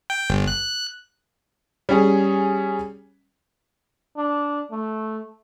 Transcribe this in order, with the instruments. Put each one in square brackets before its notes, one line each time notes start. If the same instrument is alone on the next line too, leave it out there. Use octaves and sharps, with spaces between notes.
[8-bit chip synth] G5
G1
F#6
[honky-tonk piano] G3 C#4 G#4
[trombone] D4
A3